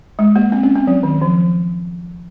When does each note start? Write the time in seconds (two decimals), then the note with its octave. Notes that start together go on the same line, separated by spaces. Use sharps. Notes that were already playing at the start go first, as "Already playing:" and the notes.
0.19 G#3
0.36 A#3
0.52 C4
0.63 C#4
0.76 C4
0.87 F#3
1.03 D#3
1.22 F3